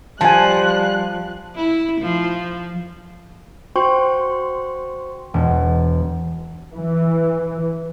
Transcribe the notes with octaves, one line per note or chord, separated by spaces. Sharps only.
F3 G3 G#5 A5 F#6
E4
F3
F#4 C5 G5 C6 C#6
E1
E3